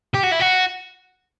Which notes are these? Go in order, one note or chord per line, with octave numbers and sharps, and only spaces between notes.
G4
F#4
E4
F#4